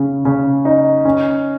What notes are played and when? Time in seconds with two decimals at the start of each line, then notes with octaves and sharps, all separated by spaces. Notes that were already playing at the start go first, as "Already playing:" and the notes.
Already playing: C#3
0.25 C#3
0.65 D#4
1.05 C#4